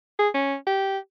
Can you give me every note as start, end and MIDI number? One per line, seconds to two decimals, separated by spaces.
0.19 0.28 68
0.34 0.55 61
0.67 0.98 67